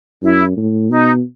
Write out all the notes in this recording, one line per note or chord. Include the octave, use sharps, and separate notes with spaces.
F#2 E4
A2
B2 D#4